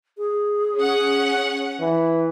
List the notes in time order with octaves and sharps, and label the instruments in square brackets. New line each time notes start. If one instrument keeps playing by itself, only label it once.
[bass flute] G#4
[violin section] C#4 F#5
[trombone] E3